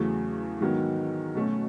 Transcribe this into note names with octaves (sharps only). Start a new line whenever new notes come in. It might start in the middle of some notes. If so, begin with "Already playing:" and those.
Already playing: E2 C#3 F#3 A3
G#2 D#3 F#3 B3
B2 F#3 A3 C#4